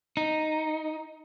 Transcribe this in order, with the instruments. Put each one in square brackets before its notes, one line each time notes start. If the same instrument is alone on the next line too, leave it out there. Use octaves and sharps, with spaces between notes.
[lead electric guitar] D#4